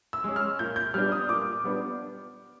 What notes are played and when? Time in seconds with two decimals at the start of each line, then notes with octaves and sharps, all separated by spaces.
0.13 E6
0.24 G#3 C#4
0.36 F6
0.59 A#2 G6
0.76 G6
0.94 G3 B3 D4 F6
1.12 D#6
1.29 A#2 D6
1.64 G3 B3 D4